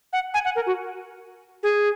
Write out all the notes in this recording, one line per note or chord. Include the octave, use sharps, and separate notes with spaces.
F#5
G#5
F#5
A#4
F#4
G#4